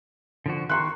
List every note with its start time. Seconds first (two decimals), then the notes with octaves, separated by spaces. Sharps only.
0.46 D3 F3 F#4
0.69 D#3 A#5 C6 C#6 F#6